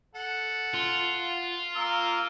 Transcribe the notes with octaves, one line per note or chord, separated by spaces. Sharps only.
A4 F#5
F4
A#3 A#4 E6